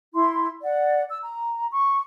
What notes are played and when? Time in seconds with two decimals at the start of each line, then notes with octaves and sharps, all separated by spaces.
0.13 E4 C6
0.62 D5 F#5
1.09 E6
1.22 A#5
1.71 C#6